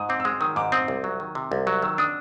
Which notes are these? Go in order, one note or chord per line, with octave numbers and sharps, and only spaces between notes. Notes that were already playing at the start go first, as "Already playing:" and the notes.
Already playing: G#2 D#6
C4 D6
E6
G#3 D#6
D#3 D#6
G#2 D6
C4 D#6
C2
F#3
D#3
C3
C2
F#3
D#3 E6
D4 D#6